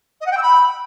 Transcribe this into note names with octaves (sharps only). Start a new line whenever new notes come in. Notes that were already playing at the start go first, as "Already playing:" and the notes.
D#5
F#5
G5
E6
B5